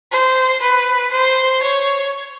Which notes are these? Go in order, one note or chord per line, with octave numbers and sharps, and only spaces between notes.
C5
B4
C5
C#5